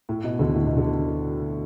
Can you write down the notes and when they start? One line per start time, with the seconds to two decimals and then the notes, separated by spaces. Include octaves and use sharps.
0.09 A2
0.24 B2
0.39 D2 D3
0.55 A2
0.66 B2
0.77 D3